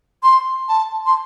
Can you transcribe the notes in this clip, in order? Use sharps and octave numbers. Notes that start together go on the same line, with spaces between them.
C6
A5
C6